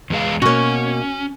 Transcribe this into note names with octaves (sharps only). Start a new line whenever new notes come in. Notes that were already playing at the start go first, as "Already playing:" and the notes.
E2 G#3 F5
B2 A#3 C#4 F#4 C#5